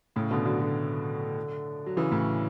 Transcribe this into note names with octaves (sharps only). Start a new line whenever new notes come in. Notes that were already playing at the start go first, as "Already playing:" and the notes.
A2 C#3
B2 D3
D3 F#3
D3 F#3
F#3
C#3 E3
A2 C#3